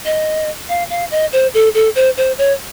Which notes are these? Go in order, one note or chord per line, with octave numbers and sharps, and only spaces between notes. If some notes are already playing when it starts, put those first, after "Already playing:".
D#5
F5
F5
D#5
C5
A4
A4
C5
C5
C#5